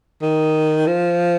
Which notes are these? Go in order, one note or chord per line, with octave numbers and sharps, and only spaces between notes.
D#3
F3